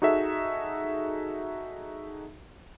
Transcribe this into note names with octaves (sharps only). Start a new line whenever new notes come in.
D#4 F#4 G#4 A4 E5